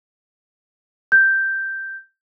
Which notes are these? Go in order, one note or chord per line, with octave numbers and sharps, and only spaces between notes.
G6